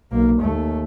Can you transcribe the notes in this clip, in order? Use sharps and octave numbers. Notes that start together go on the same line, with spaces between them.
B1 A#3
D#2 A3